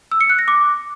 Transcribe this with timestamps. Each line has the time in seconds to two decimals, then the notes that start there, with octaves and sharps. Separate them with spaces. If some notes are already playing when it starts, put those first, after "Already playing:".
0.12 E6
0.21 C#7
0.30 F#6
0.39 A#6
0.48 D6